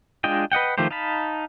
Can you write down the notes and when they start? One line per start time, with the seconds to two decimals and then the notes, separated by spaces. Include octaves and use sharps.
0.24 G#3 D4 F4 D#5 G5
0.52 B4 D#5 F#5 G5
0.78 D#3 F3 A3 G4 C5
0.91 D#4 F5 A5 B5